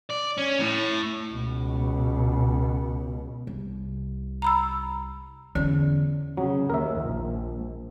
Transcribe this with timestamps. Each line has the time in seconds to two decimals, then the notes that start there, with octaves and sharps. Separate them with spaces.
0.10 D5
0.38 C#4
0.60 A2
1.32 C#2 B2
3.47 C2
4.42 A#5 B5 E6
5.55 E2 D3 C#4
6.37 C#3 F#3
6.70 D#2 A#4 E5
7.00 A#1